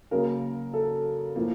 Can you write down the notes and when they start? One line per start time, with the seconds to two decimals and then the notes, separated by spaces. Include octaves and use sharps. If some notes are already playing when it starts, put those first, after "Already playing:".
0.11 C#3 F#3 A#3 A#4
0.74 A4
1.36 A2 F3 A#3